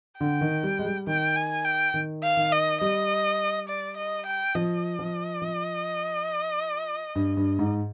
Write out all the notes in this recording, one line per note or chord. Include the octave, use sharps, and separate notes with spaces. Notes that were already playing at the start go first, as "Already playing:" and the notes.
D3 G5
D#3
G3
G#3
G3
D#3 G5
G#5
G5
D#3
F5
D#3
D#5
G3 D#5
D5
D#5
G5
F3 D#5
F3
F3
G2
G2
G#2